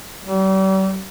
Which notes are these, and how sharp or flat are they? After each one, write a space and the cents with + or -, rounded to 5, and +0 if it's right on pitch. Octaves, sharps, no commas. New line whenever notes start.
G3 -40